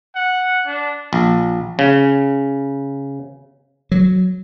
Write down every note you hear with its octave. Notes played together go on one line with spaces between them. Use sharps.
F#5
D4
A#1
C#3
F#3